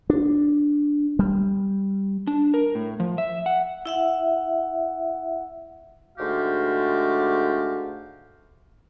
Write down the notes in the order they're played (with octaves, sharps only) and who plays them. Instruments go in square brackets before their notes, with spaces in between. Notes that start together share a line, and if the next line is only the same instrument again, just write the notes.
[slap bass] D4
G3
[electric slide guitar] D4
A#4
A2
F3
E5
F#5
[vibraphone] E4 E5 F#5
[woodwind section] G#2 D3 A3 F#4 G4 F5